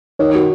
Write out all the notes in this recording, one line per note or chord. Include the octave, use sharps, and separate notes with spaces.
D#3 C#5
F#4